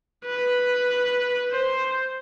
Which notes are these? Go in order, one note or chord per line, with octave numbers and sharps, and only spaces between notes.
B4
C5